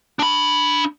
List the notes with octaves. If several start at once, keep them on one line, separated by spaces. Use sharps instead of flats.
D4 B5